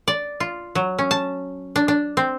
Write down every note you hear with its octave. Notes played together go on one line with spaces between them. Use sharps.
D5
F4
F#3
C#4
A5
D4
D4
C4